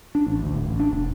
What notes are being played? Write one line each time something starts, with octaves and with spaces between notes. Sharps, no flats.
D4
A1
D2
D1
A1
D4
E1